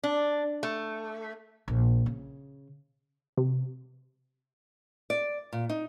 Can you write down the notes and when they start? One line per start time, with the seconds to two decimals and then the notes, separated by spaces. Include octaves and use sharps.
0.03 D4
0.63 A3
1.68 A#1
2.06 C#3
3.37 C3
5.10 D5
5.53 A#2
5.69 D#4